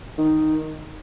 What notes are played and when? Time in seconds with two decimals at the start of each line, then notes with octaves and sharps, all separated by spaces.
0.18 D#3